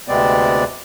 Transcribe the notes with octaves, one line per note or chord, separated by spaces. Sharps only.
D2 C3 G#3 B3 C4 D5